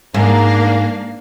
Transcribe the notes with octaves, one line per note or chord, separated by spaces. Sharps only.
G#2 A#3 D4 F5